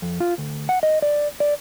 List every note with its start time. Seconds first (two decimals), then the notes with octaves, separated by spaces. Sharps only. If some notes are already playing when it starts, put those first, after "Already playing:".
0.02 F2
0.20 F4
0.38 D2
0.69 F#5
0.83 D#5
1.02 D5
1.40 D5